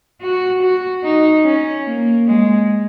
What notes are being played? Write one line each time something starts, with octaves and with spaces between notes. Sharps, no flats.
F#4
F#4
D#4
C#4
A#3
G#3